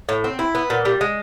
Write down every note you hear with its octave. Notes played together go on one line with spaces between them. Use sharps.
A2
C4
E4
B3
A#2
G3
G#3